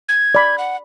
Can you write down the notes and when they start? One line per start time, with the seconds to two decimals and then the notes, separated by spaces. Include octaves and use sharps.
0.09 G#6
0.35 D5 B5
0.58 F#5